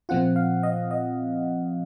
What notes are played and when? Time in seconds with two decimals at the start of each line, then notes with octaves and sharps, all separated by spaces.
0.09 A#2 F3 C4 F4 F#5
0.36 F5
0.63 D#5
0.91 D#5